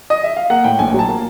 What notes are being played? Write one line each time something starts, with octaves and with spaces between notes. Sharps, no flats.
D#5
E5
F5
A#3 F#5
A2 G5
A#1 G#5
F#3 A5
A#3